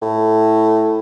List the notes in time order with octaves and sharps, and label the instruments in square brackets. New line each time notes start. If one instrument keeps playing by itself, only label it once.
[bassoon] A2